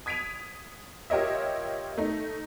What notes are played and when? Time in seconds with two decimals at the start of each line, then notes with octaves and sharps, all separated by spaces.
0.06 D#6 G#6 B6 D7 D#7 F7
1.10 F4 G4 A#4 C#5 D#5 E5
1.98 A3 D#4